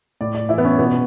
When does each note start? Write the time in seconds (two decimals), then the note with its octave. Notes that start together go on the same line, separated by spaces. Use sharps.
0.21 A2 D5
0.35 D5
0.49 E3 E4
0.58 B3
0.64 C#4
0.79 B2 B3